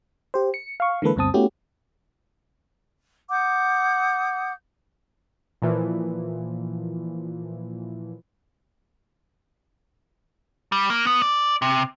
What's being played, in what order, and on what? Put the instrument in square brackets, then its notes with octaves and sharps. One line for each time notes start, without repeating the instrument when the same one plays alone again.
[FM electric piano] G4 C5
C#7
F5 C#6
D3 E3 G#3 A#3 A4 B4
D2 G2 B2 C4 A5 D#6
A3 B3 C#4 E4 F#4 G4
[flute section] F#5 D6 D#6 G6
[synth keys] A#2 E3 F3
[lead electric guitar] G3
A#3
B3
D5
C3